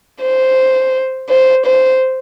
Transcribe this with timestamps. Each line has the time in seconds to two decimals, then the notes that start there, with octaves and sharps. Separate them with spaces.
0.22 C5
1.30 C5
1.66 C5